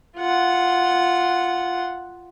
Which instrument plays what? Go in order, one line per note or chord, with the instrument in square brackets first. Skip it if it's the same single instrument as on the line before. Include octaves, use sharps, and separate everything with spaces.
[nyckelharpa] F4 F#5